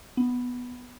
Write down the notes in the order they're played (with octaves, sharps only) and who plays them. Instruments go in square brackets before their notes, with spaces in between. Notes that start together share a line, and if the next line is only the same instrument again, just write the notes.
[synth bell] B3